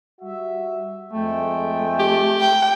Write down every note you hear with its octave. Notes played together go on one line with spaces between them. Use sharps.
G3 F#4 E5
F2 G#3 A3 G5
G4
G5